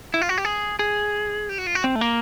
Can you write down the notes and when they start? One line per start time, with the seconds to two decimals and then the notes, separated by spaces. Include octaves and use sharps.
0.14 E4
0.21 F4
0.29 F#4
0.38 G4
0.45 G#4
0.79 G#4
1.49 G4
1.58 F#4
1.67 F4
1.75 F#4
1.84 C4
1.96 A3
2.01 A#3